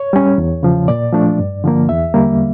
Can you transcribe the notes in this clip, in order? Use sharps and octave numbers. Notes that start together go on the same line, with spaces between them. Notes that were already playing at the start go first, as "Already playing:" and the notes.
Already playing: C#5
G3 C#4
E2
C#3 F3
A#2 D5
F3 A3 D4
G2
D3 F3 A#3
E2 E5
D3 G3 A#3